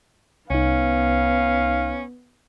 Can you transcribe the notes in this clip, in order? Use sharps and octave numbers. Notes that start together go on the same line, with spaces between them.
C2 B3 C#4 D#4 F5